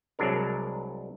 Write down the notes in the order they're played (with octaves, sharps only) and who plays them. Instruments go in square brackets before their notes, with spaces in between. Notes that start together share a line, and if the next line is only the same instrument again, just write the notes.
[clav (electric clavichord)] C2 F#3 G#3 D4 A#4